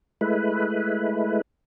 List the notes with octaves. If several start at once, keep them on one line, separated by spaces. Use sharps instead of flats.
G#3 A3 E4 B4